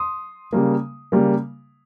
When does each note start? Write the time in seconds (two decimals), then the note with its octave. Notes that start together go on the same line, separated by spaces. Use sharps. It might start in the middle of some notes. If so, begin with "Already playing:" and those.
Already playing: C6 D#6
0.53 C#3 G3 A#3
1.12 C#3 G3 A#3